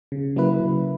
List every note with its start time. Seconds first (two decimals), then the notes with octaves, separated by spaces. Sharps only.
0.12 C#3
0.36 F#3 A#3 E4 B4
0.60 C#3